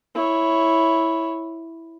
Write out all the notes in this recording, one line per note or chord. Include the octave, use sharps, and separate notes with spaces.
E4 C#5